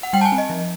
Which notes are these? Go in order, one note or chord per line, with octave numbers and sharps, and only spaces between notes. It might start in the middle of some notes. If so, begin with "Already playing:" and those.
F#5
G3 G5
A5
G#5
C4
D#5
F3